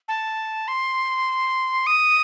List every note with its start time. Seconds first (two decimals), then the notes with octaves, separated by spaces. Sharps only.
0.08 A5
0.68 C6
1.87 D#6